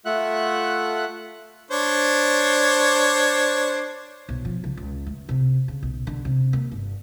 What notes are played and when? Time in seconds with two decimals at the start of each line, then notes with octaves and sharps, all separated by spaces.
0.05 A3 F4 E5 F#5 F#6
1.71 D4 C5 C#5
4.29 B1
4.45 F3
4.64 C#3
4.77 C#2
5.06 A3
5.29 C3
5.68 C#3
5.83 B1
6.07 D3
6.25 C3
6.53 A#3
6.72 G1